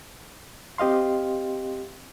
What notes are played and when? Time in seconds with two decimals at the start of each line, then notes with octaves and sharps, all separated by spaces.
0.78 C4 G4 D#5 F5 C6